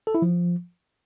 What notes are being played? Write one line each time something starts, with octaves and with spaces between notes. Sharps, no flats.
A4
E4
F3